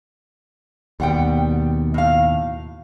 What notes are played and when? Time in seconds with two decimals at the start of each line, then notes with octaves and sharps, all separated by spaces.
1.00 D#2 B2 G3 F#5 G5
1.94 A2 F5